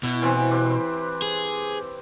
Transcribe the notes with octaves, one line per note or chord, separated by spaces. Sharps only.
B2 E4
C3 E3 C4
C4 G4 B4
G#4